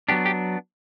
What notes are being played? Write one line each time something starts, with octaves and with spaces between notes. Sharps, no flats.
F#3 B3 D4 G4
G4